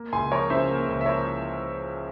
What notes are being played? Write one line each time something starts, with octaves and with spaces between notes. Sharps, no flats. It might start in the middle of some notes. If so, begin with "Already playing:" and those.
Already playing: A#3
C#2 G#5 C6
F3 A#4 C#5
C#3 C5 E5
A#3
C#2
E5
F3 A#4 C#5